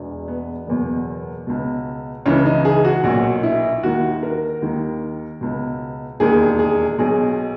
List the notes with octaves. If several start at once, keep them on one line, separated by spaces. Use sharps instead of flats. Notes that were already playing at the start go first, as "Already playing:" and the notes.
Already playing: E1 E2 B2
B3
F#1 E2 B2
C#2 B2
C#2 C#3 E3 C#4
D#4
G#4
F#4
B1 A#2 F#4
E4
D#2 D#3 F#4
A#4
D#2 D#3
C#2 B2
E1 D#2 D#3 G#4
G#4
B1 B2 G#4